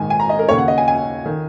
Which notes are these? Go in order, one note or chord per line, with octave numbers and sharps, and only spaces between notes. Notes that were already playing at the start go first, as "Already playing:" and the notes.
Already playing: A#1 G#2 D#3 G#5
G#5
A#5
D#5
A#4
D#2 C#3 C#5
F#5
D#5
G#5
G#5
D#3